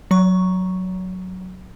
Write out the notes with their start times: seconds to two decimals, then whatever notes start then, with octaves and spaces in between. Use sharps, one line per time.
0.11 F#3 C#6